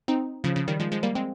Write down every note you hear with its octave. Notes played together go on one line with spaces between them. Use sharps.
C4 D#4
C#3 F3
C#3 F3
D#3 G3
F3 G#3
F3 G#3
G3 A#3
G#3 C4